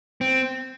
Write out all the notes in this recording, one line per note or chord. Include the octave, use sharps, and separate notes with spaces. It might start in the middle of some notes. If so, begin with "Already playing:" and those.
C4